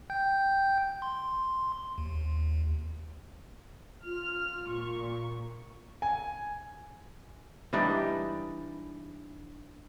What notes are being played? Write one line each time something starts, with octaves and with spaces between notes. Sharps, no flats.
G5 G6
C6
D#2
F4 F6
A#2 C#6
G#5
E3 G3 D4 D#4